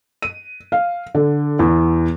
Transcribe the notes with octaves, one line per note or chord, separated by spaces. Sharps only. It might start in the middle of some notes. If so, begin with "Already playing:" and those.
D#7
F5
D3
E2